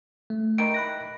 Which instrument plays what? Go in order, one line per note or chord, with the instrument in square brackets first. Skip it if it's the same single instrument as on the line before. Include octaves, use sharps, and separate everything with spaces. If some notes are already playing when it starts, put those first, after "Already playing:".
[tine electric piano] A3
[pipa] D#3 E3 G3 [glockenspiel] D7
[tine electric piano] B5 F#6 A#6